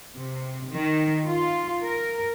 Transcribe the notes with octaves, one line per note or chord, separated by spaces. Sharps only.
C3
D#3
F4
A#4